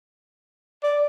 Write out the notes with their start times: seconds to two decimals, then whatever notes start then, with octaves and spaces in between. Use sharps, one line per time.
0.83 D5